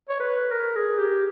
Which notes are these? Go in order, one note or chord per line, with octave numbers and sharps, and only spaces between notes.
C#5
B4
A#4
G#4
G4